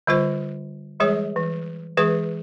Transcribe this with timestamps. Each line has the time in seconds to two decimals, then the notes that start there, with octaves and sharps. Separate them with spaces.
0.07 D3 G3 F4 C5
1.00 E3 G3 G#3 G#4 C#5
1.36 E3
1.97 E3 G#3 G#4 B4